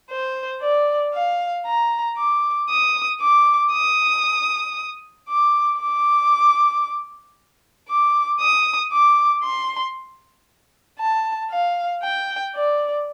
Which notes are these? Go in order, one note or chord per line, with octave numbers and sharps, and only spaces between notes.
C5
D5
F5
A#5
D6
D#6
D6
D#6
D6
D6
D6
D#6
D6
C6
A5
F5
G5
D5